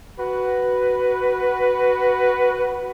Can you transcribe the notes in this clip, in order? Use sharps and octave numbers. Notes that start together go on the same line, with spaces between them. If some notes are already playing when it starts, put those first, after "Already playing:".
F#4 B4